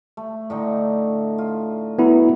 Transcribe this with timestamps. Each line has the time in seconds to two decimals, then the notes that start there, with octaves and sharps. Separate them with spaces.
0.17 A3
0.50 A2 D3 D#4
1.38 F4
1.99 F#3 B3 E4